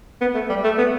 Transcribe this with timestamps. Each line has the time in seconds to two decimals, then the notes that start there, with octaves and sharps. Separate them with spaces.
0.21 B3
0.35 A3
0.49 G3
0.64 A3
0.78 B3